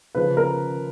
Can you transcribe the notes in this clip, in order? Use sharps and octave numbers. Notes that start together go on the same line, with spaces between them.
C#3 F3 B4
A#4